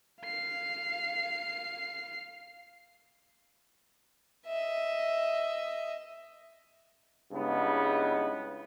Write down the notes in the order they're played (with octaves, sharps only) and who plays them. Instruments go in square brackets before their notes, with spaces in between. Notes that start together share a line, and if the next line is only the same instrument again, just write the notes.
[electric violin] F5 C7
[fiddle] D#5 E5
[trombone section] G2 C#3 G#3 B3 D#4 E4